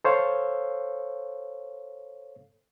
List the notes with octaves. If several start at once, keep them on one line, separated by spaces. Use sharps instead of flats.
A4 C5 C#5 F5